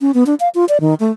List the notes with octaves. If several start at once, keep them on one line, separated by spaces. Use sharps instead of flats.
C#4
B3
D4
F5
F4
D5
D#3
A3